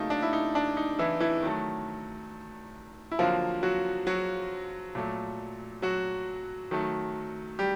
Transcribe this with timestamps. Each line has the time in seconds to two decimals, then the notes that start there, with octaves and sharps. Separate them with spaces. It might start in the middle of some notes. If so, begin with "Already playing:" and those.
Already playing: C#3 F#3 A3 A#3 D#4
0.10 D4
0.22 E4
0.33 D#4
0.55 D4
0.77 D#4
0.99 E3 E4
1.20 E3 E4
1.43 D#3 F#3 A3
3.12 E4
3.19 D3 F3 F#3 A#3 F4
3.63 F#3 F#4
4.07 F#3 F#4
4.95 A#2 F#3 A3
5.82 F#3 F#4
6.71 D#3 F#3 A3
7.59 G3 G4